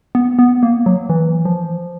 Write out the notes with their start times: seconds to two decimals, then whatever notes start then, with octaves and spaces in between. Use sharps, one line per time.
0.15 B3
0.39 B3
0.63 A#3
0.86 F#3
1.09 E3
1.45 F3